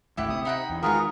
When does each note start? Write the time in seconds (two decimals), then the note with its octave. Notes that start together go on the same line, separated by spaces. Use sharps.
0.17 G#1 D2 A2 E4 G4 F#5
0.30 C3 D#6
0.45 D#4 F#5 G5 B5
0.70 E2
0.83 D#3 G#3 B3 F4 F#4 G#4 A#4 F#5